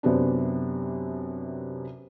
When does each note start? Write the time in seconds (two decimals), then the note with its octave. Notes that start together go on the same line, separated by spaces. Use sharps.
0.03 F#2 C3 B3 C4 D4